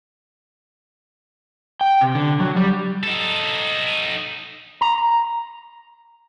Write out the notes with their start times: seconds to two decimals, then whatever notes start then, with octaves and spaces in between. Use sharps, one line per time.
1.81 G5
2.01 C3
2.15 D3
2.40 F#3
2.56 G3
3.03 D#4 A4
4.81 A#5